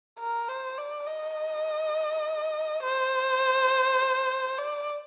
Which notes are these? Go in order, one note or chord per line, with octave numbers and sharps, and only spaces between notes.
A#4
C5
D5
D#5
C5
D5